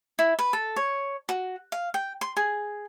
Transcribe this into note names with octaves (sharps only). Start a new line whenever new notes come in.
E4
B4
A4
C#5
F#4
F5
G5
C6
G#4